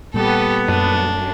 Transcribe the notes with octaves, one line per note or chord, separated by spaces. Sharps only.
A#2 G3 B3 G4 A4
F#2 D4